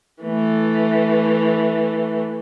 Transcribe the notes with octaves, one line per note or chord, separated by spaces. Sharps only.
E3 A3